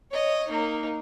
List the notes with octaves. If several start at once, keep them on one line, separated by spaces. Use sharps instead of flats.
C#5 D#5
A#3 D#4